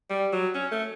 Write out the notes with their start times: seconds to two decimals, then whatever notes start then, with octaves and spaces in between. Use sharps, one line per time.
0.10 G3
0.33 F#3
0.55 C#4
0.71 A3